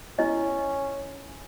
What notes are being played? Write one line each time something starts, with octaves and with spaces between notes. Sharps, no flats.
C#4 E4 D#5